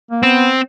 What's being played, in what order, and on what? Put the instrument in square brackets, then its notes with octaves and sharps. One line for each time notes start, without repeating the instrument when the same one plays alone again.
[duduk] A#3
[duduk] B3 [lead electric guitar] C4